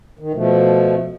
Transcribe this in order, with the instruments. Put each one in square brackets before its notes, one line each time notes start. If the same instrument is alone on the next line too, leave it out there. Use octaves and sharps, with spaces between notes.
[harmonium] D#3
B2 F3 A3